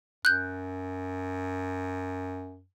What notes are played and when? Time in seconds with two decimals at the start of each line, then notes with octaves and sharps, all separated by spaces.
0.25 F#2 F#6 G6